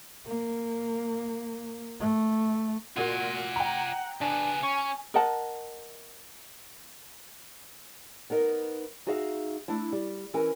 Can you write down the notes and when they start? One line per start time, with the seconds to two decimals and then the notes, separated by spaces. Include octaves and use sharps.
0.26 A#3
2.00 A3
2.97 A#2 A#3 F4 F#4 F#5 G#5
3.56 G5 A#5
4.21 C#3 B3 D4 G#5
4.63 C#4 C#6
5.14 A#4 D#5 F#5 A5
8.30 B3 D#4 A#4 D#5
9.07 D#4 F#4 G#4 D5 E5 F5
9.68 A3 D4 E4
9.93 G3
10.34 E3 C#4 A#4 E5 G#5